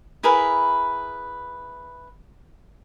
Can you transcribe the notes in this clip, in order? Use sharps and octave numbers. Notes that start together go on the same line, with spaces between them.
E4 G#4 A#4 B4